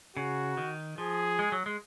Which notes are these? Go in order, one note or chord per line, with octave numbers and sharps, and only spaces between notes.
C#3 F#4
D#3
F3 G#4
G#3
F#3
G#3